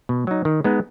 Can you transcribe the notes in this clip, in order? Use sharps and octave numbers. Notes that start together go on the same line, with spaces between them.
B2
F#3 D#4
D#3
G#3 B3 D#4